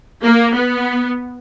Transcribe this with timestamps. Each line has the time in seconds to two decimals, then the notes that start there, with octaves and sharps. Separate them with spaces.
0.24 A#3
0.54 B3